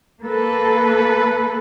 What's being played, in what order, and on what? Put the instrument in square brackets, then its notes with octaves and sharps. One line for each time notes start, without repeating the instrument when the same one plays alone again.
[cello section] A#3 A4 [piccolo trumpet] B4